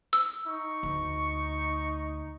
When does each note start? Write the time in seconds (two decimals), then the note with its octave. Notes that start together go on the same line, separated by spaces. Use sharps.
0.13 E6
0.47 D#4 C#6
0.83 D2